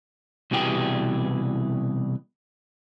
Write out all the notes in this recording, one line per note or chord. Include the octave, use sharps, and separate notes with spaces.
C2 B2 E3 G4 G#4 G5